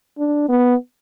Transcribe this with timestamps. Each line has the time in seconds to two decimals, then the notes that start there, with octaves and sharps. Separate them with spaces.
0.18 D4
0.49 B3